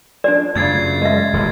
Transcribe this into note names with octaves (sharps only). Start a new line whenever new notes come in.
D4 F4 C5 D5
F#2 C#3 A3 F4 F5 G#6 A6 C7
G#3 D#5 E5
D#1 A1 B2